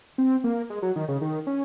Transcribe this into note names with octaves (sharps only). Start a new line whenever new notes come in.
C4
A#3
G#3
F#3
D#3
C#3
D#3
C#4